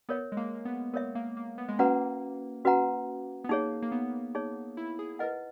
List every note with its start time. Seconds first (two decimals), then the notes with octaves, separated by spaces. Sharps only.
0.09 B3 A#4 C#5 E5
0.32 G#3
0.37 A#3
0.65 B3
0.94 B3 A#4 C#5 E5
1.15 A#3
1.37 A#3
1.58 B3
1.68 G#3
1.79 A#3 C#4 F#4 B4 F#5 A#5
2.65 C#4 F#4 B4 F#5 A#5
3.44 B3
3.49 A#3 D#4 G#4 C#5
3.82 A#3
3.92 B3
4.35 D#4 G#4 C#5
4.77 E4
4.99 G#4
5.19 E4 A#4 B4 D#5 F#5